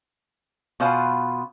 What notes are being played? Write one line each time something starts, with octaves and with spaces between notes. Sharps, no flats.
B2 B3 F4 C5 F5 G#5